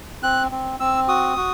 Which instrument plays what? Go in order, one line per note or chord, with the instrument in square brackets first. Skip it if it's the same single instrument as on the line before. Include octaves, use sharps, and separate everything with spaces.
[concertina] C4 F#6
C4
C4 E6
F#4 D#6
F#4